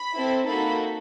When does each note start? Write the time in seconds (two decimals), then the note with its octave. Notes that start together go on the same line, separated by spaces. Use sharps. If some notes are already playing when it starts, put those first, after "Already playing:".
Already playing: B5
0.18 C4 E4 A4
0.48 A#3 D#4 F#4 A4 B5